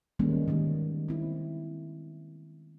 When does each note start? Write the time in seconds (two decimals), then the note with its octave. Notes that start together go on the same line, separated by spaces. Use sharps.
0.19 D#3 G3 G#3 A#3 B3 C#4
0.48 D#3 G3 A#3
1.08 C4 E4